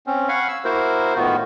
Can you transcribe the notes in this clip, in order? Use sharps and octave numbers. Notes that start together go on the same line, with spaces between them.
C4 C#4
F5 F#5 G#5 B5 C#6
E6
A#3 E4 F#4 A#4 C5
A2 D#3 B3 F4 F#4